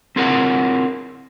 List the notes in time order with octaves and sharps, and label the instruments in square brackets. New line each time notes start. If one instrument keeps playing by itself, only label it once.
[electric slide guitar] C4 E4 F4 G#4 A#4 F#5